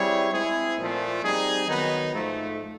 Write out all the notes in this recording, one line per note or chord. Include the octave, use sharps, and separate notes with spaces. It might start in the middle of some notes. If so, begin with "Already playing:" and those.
Already playing: G3 C4 E4 G#4 C#5
G#3 C4 E4 G#4
A#2 F3 A3
G3 C4 D#4 G#4
D#3 F#3 B3 D#4
G#2 F3 A3